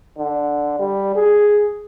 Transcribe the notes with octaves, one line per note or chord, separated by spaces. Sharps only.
D3
G3
G#4